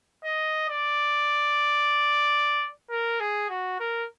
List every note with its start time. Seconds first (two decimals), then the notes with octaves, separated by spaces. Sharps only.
0.24 D#5
0.69 D5
2.90 A#4
3.20 G#4
3.49 F#4
3.79 A#4